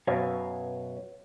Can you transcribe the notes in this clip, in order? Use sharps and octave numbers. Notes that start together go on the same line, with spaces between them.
F#2 B2 B4 C#5 F5